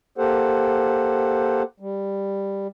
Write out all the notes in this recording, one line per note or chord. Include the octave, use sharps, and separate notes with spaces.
A#3 G4 A4 C5 F#5
G3